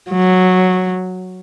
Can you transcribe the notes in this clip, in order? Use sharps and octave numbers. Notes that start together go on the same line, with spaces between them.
F#3